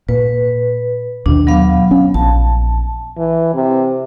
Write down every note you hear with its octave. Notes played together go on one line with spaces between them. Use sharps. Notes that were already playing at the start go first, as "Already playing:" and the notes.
A#2 B4
D#2 B2 D#3 D4
F#3 B3 F5
C#4
A#1 A5
E3
C3